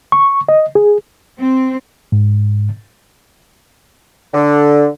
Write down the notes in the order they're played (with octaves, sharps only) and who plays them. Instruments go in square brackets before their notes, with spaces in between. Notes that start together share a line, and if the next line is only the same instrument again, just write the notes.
[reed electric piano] C#6
D#5
G#4
[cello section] C4
[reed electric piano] G#2
[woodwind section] D3